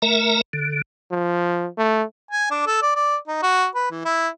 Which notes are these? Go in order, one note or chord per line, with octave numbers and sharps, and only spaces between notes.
A3 A#4 E5 A#5
D3
F3
A3
G#5
D4
A4
D5
D5
D#4
F#4
B4
E3
E4